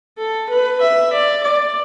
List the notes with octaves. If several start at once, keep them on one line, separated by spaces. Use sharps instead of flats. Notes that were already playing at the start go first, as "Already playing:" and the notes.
A4
B4
E5
D5
D5